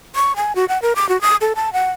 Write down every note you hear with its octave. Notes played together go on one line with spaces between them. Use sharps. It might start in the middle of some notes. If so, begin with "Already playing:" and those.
C#6
G#5
F#4
F#5
A#4
D6
F#4
D#6
A4
A5
F#5